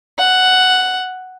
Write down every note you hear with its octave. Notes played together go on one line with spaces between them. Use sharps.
F#5